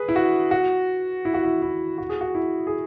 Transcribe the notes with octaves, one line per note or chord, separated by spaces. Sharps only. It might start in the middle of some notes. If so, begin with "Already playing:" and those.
Already playing: G#4 B4
E4
F#4
F#4
E4
F#4
E4
E4
F#4
G#4
F#4
E4
G#4